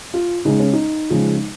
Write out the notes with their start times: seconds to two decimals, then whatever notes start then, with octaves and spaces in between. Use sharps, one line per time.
0.14 F4
0.45 C#3 G#3 D#4
0.59 C#4
0.73 D#4
1.10 C#3 F3 G#3